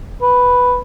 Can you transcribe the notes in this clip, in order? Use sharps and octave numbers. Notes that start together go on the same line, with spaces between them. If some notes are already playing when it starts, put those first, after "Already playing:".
B4